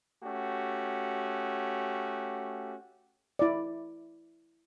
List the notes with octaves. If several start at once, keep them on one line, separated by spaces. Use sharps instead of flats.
A3 C#4 F#4 G4
E4 D5